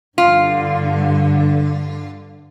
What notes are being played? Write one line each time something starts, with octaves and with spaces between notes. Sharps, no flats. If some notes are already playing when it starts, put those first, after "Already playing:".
G2 D3 F4